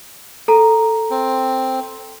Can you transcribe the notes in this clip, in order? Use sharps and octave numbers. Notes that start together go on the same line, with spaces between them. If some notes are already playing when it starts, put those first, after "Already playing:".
A4 A#5
C4